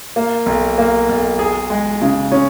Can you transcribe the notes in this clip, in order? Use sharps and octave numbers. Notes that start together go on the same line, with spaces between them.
A#3
B1
A#3
B1
G#4
G#3
C#3
C#4